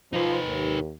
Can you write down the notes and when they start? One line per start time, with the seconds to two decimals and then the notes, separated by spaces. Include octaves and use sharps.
0.13 F3 D#4 B4
0.46 D#2